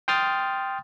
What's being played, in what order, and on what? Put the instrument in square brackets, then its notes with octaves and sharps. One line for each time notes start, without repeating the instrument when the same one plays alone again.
[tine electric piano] G5 C6 D#6 F6 A6